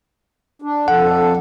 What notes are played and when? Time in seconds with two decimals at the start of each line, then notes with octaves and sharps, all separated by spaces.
0.62 D4
0.88 F2 F3 A4 F#5